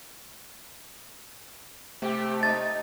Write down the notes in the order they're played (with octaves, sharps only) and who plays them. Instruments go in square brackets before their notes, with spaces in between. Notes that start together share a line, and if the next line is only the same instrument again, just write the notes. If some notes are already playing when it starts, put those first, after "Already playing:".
[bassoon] C3 [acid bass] A3 [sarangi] G4
[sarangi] D#4 [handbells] A6